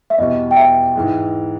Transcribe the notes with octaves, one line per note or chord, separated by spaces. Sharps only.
E5
E2 B2 G3 D#5
G5
E5
G#2 E3 G#3